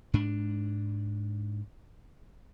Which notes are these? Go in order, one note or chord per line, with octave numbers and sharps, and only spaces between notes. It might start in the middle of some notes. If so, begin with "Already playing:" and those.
G#2 D4